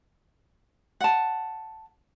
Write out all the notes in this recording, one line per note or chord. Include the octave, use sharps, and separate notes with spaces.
F#5 A5